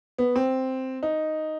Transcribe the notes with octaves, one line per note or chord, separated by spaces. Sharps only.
B3
C4
D#4